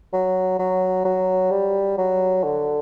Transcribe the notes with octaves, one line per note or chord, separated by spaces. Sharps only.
F#3
F#3
F#3
G3
F#3
D3